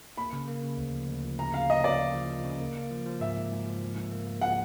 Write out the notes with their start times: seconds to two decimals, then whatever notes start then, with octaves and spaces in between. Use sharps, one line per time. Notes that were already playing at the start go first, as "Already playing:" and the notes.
0.17 A#3 B5
0.33 C#3
0.48 A#3
0.63 C#3
0.78 D2
0.93 F3
1.08 D2
1.24 F3
1.39 C#3 A#5
1.54 C#3 F5
1.70 A#3 D#5
1.84 C#3 D5
2.00 C#3
2.15 F3
2.30 F3
2.44 C#3
2.60 A#3
2.76 A#3
2.91 F3
3.06 F3
3.20 G#2 E5
3.37 G#2
3.52 G#2
3.66 F3
3.82 F3
3.96 G#2
4.12 A#3
4.27 A#3
4.41 F3 F#5